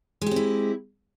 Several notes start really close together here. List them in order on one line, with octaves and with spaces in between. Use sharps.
G#3 G4 C4 E4